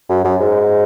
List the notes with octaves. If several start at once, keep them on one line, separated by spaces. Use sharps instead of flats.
F#2
F#2
G#2